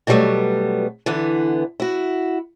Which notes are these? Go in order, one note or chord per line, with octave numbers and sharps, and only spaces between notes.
B2 D3 F#3 G3 A3 B3
D3 E3 B3
E4 F#4